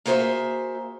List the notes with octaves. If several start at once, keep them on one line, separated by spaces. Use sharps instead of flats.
A#3 F#4 G#4 C5 D#5 E5